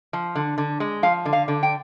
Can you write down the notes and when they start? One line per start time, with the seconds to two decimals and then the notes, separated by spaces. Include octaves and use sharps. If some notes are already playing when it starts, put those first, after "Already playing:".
0.13 F3
0.35 D3
0.58 D3
0.80 G#3
1.03 F3 F5
1.25 D3
1.33 F5
1.48 D3
1.63 G5